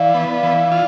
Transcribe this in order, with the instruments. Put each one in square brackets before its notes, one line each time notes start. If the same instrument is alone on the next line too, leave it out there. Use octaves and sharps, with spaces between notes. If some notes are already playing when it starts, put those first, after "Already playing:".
Already playing: [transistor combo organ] E3 [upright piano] D5 F5
[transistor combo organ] B3
E3
F4